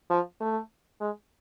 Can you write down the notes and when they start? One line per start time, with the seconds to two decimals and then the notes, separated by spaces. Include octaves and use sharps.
0.10 F3
0.40 A3
1.01 G#3